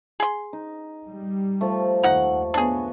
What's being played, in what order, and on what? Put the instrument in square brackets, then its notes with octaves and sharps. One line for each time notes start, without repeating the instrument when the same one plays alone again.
[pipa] G#4 C6
[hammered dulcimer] D#4
[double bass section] G3
[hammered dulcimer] F3 A3
[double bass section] D#2 [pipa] D#4 F#5
[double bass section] B3 [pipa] D4 G#4 [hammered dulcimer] C#5 D#5